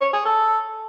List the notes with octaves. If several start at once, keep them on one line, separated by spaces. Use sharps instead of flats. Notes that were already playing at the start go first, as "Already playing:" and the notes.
C#5
G#4
A4